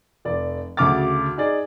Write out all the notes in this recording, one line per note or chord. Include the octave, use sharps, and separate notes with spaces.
F1 D5
D2 C#3 F#4 D6 F6 A6
D#4 G#4 D5